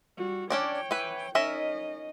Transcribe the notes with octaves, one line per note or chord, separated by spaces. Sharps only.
G3 F#4
C#4 D4 C#5 D5 G5
E3 B4
C#4 D#4 A#4 D#5 E5